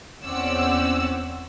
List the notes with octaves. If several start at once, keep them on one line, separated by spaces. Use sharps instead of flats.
E2 C4 C#4 D5 F#5 E6